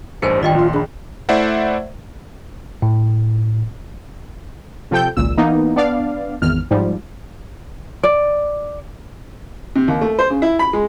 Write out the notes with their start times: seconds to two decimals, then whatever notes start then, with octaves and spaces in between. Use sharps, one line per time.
0.22 A1 G2 D#4 A#4 C5 G#5 C#7
0.43 D#3 F4 D5 D#5 G5
0.55 A#1 F4 C6
0.74 D4 G#4 B5
1.29 A3 E4 C5 D5 E5 F#5
2.82 A2
4.91 C3 F3 A4 G5 G6
5.17 G#1 C#2 A#2 E6
5.38 E3 A#3 B3 D#4
5.76 B3 D4 D5 F5
6.42 G#1 E2 F6
6.71 G#2 F3 G3
8.03 D5
9.76 C3
9.88 D#2
10.01 A3
10.19 C5
10.30 C#3
10.42 E4
10.59 B5
10.73 G#3